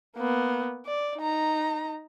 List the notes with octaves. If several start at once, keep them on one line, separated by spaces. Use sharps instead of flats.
A#3 B3
D5
D#4 A#5